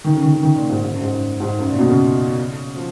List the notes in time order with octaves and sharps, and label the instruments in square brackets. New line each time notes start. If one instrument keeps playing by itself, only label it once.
[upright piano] D#3
C#3
D#3
C#3
D#3
A#2
G#2
G#2
F#2
G#2
F#2
G#2
F#2
A#2
B2
C#3
F3